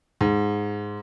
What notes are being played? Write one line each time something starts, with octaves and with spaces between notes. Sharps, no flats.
G#2